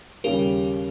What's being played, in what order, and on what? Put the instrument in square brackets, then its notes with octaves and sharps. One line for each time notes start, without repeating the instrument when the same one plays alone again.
[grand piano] D#2 C#3 G3 [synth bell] G4 A#4